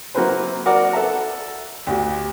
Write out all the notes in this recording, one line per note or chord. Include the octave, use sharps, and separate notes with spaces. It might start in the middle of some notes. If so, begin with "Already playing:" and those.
F#3 A#3 C4 E4 B4 C5
F#4 A#4 D5 F#5 D6
A4 B4 E5 A#5
D2 F#4 G4